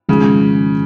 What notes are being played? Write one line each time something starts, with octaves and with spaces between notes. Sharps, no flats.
G#1 G#2 C#3 F3